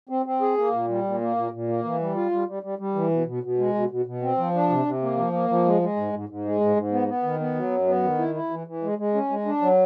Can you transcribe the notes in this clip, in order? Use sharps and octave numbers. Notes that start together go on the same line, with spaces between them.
C4
C4
G#4
A#3
A#2
G3
A#2
A#3
A#2
A#2
A#3
E3
G3
F4
G3
G3
G3
G3
E3
B2
B2
B2
G#3
B2
B2
B2
C4
F3
D4
C3
C3
A#3
F3
A#3
F3
G#3
G#3
G#2
G#2
G#2
G#3
G#2
G#2
B3
B3
D#3
B3
F#3
F#2
B3
D#3
E4
E4
E3
E3
G#3
G#3
C#4
G#3
D4
F#3